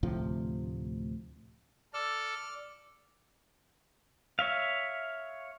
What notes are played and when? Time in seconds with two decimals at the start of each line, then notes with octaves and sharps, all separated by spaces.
0.03 D2 A2 C3 F3
1.94 A4 D5 F6
4.39 C#5 E5 F5